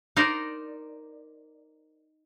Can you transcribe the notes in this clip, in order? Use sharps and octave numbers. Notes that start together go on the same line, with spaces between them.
D#4 A#4 C5 D5